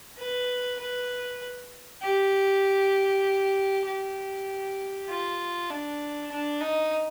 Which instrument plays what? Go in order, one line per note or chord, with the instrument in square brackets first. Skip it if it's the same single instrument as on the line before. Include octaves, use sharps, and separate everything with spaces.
[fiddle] B4
B4
G4
G4
F4
D4
D4
D#4